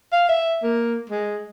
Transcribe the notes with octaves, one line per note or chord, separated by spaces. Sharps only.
F5
E5
A#3
G#3